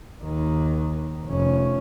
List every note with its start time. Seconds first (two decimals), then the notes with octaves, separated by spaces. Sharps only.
0.24 D#2 D#3
1.26 F1 C#4